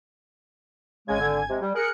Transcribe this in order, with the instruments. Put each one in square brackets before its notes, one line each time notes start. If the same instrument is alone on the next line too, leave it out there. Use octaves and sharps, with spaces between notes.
[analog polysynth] G#1 G#5 G#6 [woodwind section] C#3 G#3
[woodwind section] D3
C3 G#3
G3
[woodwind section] G#4 A#4 [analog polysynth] F#6 C#7